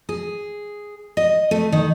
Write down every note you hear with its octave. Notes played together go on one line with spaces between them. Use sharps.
G#4
D#5
A3
D#3